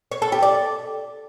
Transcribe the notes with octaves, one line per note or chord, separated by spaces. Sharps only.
C#5
A4
G4
D5